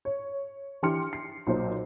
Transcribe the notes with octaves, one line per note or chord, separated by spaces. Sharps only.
C#5
E3 D4 G4 C6 F6 C#7
C7
B1 A#2 C5